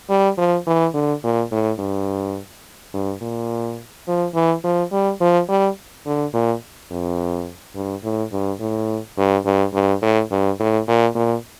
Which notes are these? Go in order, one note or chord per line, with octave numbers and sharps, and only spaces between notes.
G3
F3
E3
D3
A#2
A2
G2
G2
A#2
F3
E3
F3
G3
F3
G3
D3
A#2
F2
G2
A2
G2
A2
G2
G2
G2
A2
G2
A2
A#2
A#2